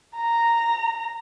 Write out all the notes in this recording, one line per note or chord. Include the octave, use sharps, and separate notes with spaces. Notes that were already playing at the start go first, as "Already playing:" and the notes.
A#5